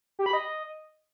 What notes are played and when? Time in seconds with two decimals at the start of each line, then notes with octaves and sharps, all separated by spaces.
0.19 G4
0.26 B5
0.33 D#5